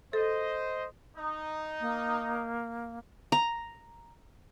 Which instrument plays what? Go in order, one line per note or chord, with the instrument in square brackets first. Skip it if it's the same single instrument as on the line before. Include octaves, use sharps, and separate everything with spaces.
[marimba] A4 [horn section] C5 D#5
[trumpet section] D#4
[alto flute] A#3
[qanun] A#5